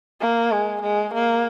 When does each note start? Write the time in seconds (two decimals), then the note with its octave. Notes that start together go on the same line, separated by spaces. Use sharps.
0.21 A#3
0.52 G#3
0.82 G#3
1.14 A#3